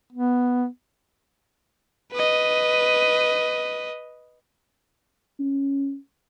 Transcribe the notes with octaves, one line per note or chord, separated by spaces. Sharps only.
B3
B4 D#5
C#4